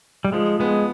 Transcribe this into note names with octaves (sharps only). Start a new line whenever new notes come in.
G3
F3 G#3
G#3 B3